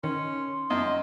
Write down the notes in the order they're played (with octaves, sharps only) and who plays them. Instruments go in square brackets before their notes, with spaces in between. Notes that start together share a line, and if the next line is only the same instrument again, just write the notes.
[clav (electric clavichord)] D#3 [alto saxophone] C#4 [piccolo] C6
[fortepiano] F#2 [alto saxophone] D#5